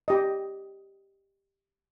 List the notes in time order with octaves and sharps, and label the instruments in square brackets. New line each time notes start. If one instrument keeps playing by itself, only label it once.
[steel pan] G4 D#5